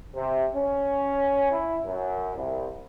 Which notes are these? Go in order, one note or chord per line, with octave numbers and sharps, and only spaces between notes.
C3
C#4
E4
F#2
C2